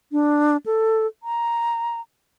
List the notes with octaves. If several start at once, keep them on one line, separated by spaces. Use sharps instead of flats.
D4
A4
A#5